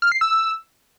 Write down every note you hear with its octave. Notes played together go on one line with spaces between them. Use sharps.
F6
C7
E6